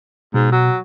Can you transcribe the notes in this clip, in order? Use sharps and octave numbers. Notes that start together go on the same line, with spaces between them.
G#2 B2
F#3